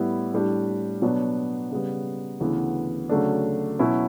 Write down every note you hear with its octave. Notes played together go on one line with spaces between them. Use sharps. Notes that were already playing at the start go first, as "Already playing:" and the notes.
Already playing: A2 G3 B3 E4
A2 G3 D4
B2 F#3 B3 D4
C#3 G3 B3
D2 C#3 E3 B3
D2 C#3 F#3 A3 D4
B2 F#3 C#4 E4